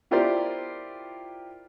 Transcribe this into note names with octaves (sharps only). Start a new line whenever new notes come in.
E4 F4 G4 A#4 C5 D5